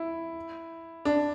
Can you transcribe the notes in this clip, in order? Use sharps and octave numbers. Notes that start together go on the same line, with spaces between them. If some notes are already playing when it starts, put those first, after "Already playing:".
Already playing: E4
D4